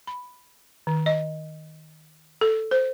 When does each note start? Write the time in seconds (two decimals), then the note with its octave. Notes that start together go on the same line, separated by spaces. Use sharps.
0.07 B5
0.87 D#3
1.06 D#5
2.41 A4
2.71 C5